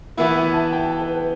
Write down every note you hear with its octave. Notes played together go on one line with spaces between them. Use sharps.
E3 B3 E4 E5
F#5
A5
G5
A5
B4
B4